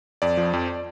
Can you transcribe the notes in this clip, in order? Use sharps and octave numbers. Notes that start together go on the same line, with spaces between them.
F2 D5
F3
F2